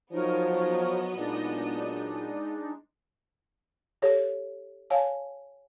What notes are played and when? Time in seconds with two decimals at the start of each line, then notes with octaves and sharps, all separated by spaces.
0.12 F3 F#3 B3 D#4 A#4 C#5 D#5
1.17 A#2 F#3 G#3 D4 D#4
4.02 G4 A4 C#5
4.90 C#5 F5 G#5 A5